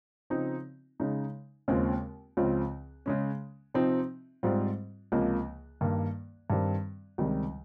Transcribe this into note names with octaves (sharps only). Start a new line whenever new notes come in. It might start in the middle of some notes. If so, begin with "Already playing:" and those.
C#3 F3 C4 D#4
C#3 G#3 D#4
D#2 C#3 G#3 C4 F4
C#2 C#3 F3 C4 F4
C#3 G#3 C#4
C3 F3 C4 D#4
G#2 G3 C4 F4
C#2 C3 F3 A#3
G2 D#3 A#3
G2 D#3 G3 C4
C#2 C3 D#3 G3